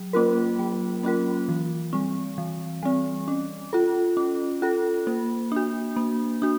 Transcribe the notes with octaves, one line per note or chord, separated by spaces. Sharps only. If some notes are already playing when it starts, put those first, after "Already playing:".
Already playing: F#3
A#3 C#4 F4 A#4
F#3
A#3 C#4 F4 A#4
E3
G3 C4
E3
G3 C4
C#4
F4 A4
C#4
F4 A4
A#3
D4 F#4
A#3
D4 F#4